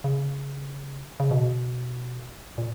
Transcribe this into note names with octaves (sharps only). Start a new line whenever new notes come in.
C#3
C#3
B2
A#2